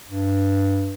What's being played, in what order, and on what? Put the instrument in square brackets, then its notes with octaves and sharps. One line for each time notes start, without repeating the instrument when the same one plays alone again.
[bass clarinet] G2